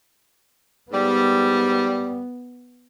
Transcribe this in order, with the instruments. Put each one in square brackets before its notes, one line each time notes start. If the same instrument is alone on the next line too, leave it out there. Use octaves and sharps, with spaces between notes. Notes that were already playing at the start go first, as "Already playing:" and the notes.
[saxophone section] G#2 G3 [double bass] B3